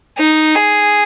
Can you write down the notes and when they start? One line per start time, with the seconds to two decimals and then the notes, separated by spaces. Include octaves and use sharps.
0.18 D#4
0.55 G#4